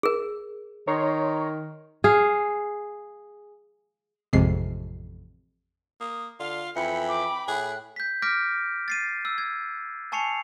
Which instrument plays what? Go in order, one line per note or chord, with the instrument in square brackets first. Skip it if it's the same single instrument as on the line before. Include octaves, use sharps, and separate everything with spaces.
[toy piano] G#4 A#4
[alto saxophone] D#3 [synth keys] C#5 A#5 C6
[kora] G#4 F5
[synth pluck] A1 F2 C3 G#3 C7
[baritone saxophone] A#3 [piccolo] D#6
[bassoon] D3 [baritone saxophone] F4 [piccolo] F5
[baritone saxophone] F2 [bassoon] E3 [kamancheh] G5 B5 [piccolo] C#7
[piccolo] D6
[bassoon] A2 [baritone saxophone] G#4 [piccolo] F#6
[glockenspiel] G6 B6
D6 F6 G6 A#6 B6 D7
A6 C7 D#7
E6
G#6
G#5 A5 C#6 C7 C#7 F7